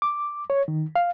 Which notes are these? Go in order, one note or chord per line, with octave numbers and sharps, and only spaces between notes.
D6
C#5
D#3
F5